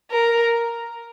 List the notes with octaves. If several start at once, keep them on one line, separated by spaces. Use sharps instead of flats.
A#4